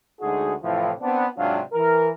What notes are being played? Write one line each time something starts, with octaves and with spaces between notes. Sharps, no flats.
D2 G#3 D#4 F#4 G#4
A2 C3 E3 F3
B3 C4 D4
G#2 C3 F#3 D4 F4
E3 A#4